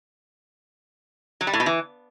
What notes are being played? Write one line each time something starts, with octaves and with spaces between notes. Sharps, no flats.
F#3
G3
A2
B2
E3